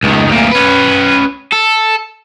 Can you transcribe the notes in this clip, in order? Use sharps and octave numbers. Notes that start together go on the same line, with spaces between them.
C#2 D#3
D2 A#2
C#4 B4
A4